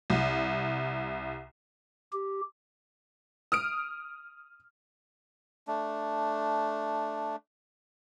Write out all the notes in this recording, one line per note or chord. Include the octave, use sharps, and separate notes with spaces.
C2
G4
D#6 F6 D7
A3 D4